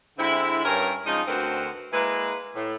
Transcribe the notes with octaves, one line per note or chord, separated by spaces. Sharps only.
D3 G#3 C4 E4
G2 C#4 A#4
C#3 F3 G#3 D#4
D2 D3 C4 F#4 A#4 B4
G#3 A#3 E4 B4
A2